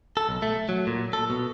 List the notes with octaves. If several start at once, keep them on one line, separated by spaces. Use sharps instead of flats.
A4
B1
A3
F#3
A#2
A4
B2